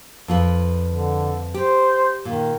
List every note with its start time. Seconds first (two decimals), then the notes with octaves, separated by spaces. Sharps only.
0.28 F2 F4 B4
0.90 D3
1.54 G4 C5
2.25 A#2 D#3